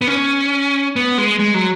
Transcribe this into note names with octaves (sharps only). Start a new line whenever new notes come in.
B3
C#4
B3
G#3
G#3
F#3